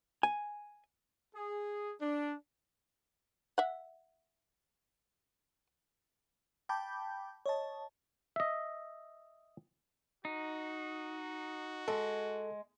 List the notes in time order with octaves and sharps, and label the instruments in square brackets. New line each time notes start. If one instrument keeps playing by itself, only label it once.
[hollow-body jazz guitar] G#5
[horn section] G#4
D4
[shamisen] E5 F#5
[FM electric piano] G5 A5 B5 D6 G6
C#5 D#5 A5
[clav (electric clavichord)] D#5 E5
[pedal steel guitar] D#4 [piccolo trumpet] F#4
[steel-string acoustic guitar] G#3 [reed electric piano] A4